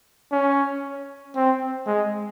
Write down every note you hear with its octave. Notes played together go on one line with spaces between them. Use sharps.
C#4
C4
G#3